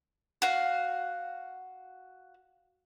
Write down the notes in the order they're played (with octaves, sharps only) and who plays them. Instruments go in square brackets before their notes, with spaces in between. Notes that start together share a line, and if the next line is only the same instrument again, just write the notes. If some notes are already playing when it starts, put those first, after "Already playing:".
[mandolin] F#4 F5